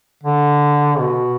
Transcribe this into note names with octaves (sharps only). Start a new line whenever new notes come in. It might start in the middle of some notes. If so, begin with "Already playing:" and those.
D3
B2